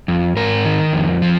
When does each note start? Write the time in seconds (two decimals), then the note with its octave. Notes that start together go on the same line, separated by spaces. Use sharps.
0.08 F2
0.36 G#2 A#4
0.65 D#3
0.93 F2
1.22 F3